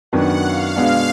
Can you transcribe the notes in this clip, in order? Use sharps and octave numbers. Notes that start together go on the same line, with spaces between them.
F#2 D#3 F#3 B3 D4 F#5
F5
B2 G#3 B3 D4